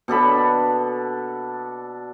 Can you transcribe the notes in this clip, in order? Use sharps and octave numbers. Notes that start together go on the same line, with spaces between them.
B2 D4 A4 B5